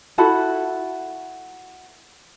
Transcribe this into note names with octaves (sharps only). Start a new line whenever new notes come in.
E4 F#4 A4 B5